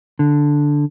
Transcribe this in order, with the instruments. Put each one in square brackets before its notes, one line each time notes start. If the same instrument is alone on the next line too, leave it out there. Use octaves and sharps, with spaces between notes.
[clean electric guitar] D3